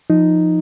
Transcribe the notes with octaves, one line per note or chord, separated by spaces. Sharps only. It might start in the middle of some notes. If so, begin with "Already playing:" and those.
F3 D#4